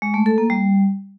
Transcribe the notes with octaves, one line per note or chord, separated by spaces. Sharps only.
G#3
A3
A4
A#3
G3